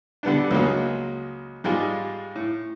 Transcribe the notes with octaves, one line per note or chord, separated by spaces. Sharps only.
D3 G3 B3 D4
C#2 F#3 G#3 A#3
G#2 G3 G#3 F4
A2